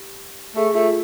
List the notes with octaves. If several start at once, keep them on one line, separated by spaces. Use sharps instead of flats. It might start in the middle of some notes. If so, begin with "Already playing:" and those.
Already playing: G4
A3 G#4
A3 F4